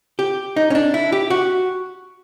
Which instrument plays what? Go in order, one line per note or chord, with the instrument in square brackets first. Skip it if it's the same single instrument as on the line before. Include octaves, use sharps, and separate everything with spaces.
[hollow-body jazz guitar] G4
D#4
C#4
D4
E4
G4
F#4